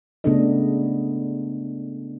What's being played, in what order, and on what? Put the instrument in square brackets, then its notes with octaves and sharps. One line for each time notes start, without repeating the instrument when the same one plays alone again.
[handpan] C#3 A3 B3 D4 A4 D#5